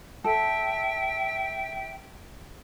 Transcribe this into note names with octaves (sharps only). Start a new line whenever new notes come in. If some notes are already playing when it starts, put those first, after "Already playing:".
A4 E5 G5